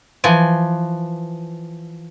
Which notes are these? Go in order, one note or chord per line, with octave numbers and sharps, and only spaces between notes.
E3 F3 G#5